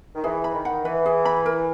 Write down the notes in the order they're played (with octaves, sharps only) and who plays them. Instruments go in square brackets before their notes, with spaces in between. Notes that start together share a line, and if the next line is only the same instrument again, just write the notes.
[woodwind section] D#3
[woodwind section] E3 [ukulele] G#4
[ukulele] B5
[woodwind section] D#3
[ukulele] F#5
[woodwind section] E3 [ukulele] B4
[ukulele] G#4
B5
A#4